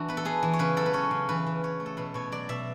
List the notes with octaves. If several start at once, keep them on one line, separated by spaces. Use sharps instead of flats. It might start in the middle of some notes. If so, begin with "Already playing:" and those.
Already playing: E3 D4 E4 F#4
B3 B4
A4
B3 G#4
E3
C#5
C#3 B4
F#3 A4
B4
C#4 C#5
C#3
E3 B4
E3
E3 C#5
A3
A4
B2 B4
B2 C#5
F#3 D5
B2 E5